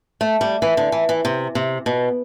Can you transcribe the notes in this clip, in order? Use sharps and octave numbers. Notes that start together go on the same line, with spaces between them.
A3
G3
E3
D3
E3
E3
C3
C3
B2